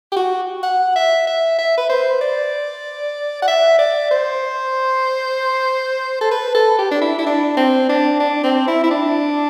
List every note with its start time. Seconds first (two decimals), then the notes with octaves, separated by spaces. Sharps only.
0.12 G4
0.17 F#4
0.63 F#5
0.96 E5
1.27 E5
1.59 E5
1.78 B4
1.90 C5
2.21 D5
3.42 F#5
3.48 E5
3.79 D5
4.11 C5
6.21 A4
6.31 B4
6.55 A4
6.79 G4
6.91 D4
7.02 E4
7.19 E4
7.26 D4
7.57 C4
7.89 D4
8.20 D4
8.44 C4
8.68 E4
8.84 E4
8.91 D4